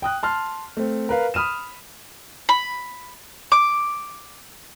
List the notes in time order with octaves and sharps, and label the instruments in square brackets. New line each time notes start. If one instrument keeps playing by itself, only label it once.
[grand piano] G5 D#6 F#6
A5 C6 F6
A3 C4
A#4 B4 F5
B5 D#6 F6 D#7 E7
[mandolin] B5
D6